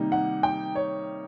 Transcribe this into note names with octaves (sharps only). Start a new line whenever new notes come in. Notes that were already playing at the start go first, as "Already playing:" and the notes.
Already playing: C3 D#3 G3 A#3 D#4
F#5
G5
C#5